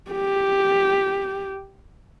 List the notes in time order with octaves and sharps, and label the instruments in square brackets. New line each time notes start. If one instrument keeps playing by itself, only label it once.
[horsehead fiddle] G4